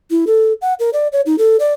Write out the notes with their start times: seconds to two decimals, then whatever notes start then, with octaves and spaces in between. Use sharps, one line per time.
0.11 E4
0.27 A4
0.62 F#5
0.80 A#4
0.93 D5
1.13 C#5
1.26 D#4
1.38 A4
1.60 D5